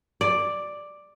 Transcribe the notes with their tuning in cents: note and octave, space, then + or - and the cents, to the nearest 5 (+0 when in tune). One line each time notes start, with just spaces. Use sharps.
D5 +5